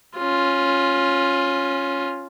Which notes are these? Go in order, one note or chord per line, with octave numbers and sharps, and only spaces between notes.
C#4 F4